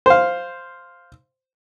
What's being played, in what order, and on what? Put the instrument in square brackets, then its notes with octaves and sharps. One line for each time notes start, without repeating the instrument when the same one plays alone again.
[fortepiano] C5 F5